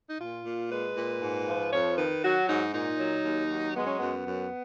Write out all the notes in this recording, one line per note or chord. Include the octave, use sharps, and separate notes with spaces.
D#4
A#2 F4
A#2
G#3 B4
A#2
G#2
F3
F2 C#5
D#3 B4
F#3 F#4
G#2 D#4
A#2 D#4
F#3
D#2
F#3
G#3 B3
C#4
F#2 B3
F#2